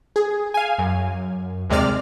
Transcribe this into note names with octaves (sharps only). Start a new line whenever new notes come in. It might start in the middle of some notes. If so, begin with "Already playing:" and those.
G#4
F5 G#5
F#2
D#2 C3 G#3 D5 F6